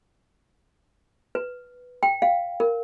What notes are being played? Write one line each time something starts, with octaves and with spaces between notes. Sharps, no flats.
B4
G5
F5
A#4